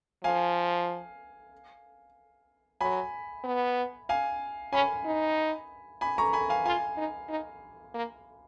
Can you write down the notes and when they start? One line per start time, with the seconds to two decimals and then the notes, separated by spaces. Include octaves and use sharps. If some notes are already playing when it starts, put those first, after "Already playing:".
0.24 F3 F5 G#5
2.81 F#3 G#5 B5
3.44 B3
4.09 F5 G#5
4.73 C#4 G#5 B5
5.05 D#4
6.01 G#5 B5
6.18 A#5 C#6
6.33 G#5 B5
6.50 F5 G#5
6.66 F4 F5 G#5
6.97 D#4
7.29 D#4
7.94 A#3